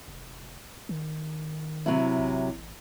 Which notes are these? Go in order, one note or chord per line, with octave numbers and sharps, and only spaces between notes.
F1
D#3
C3 F#3 E4
A1